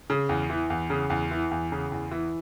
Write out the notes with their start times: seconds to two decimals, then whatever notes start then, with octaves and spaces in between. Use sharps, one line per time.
0.10 C#3
0.29 E2
0.50 E3
0.70 E2
0.90 C#3
1.10 E2
1.31 E3
1.51 E2
1.72 C#3
1.92 E2
2.12 E3